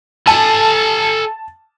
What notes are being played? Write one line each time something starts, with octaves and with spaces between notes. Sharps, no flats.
A4 G#5 A5